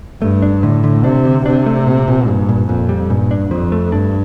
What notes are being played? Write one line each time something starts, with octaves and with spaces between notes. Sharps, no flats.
G2 A3
D4
A2 D3
D3
C3 D4
D3
C3 D4
A3
A#2
A#2
G2 A#2
A#2
F2 A#2
G3
G2 A#2
D4
F2 F3
A3
G2 D4